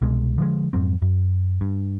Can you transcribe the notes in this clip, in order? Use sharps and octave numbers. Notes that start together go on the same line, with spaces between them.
C2 B2 G#3
D3 F3 G#3
F2 G#2 F#3 C4
F#2
G2